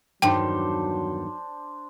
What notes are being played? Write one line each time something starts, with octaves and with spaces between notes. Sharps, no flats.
E2 G2 D#3 F#3 D4 C5 G5 C6